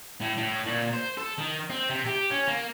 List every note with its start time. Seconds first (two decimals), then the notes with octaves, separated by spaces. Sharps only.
0.21 A2
0.37 A2
0.66 A#2
0.94 C5
1.17 A4
1.38 D#3
1.70 C4
1.89 C3
2.06 G4
2.30 C#4
2.48 A#3